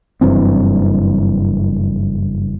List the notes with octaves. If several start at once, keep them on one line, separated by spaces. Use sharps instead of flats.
F#1 G2 E3 C4